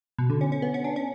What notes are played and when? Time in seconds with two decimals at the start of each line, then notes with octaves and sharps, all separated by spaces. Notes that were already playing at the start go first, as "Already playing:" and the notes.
0.18 B2
0.30 D3
0.41 C#4
0.52 C#4
0.62 B3
0.74 C#4
0.84 D4
0.96 C#4